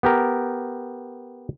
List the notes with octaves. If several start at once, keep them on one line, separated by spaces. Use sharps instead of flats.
B3 G4 A#4